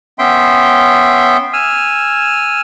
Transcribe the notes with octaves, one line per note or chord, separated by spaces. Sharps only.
B3 C#4 E5 G5 C6
G#5 E6 F6